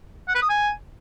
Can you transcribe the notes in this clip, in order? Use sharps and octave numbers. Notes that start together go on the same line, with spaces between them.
F#5
B4
D#6
G#5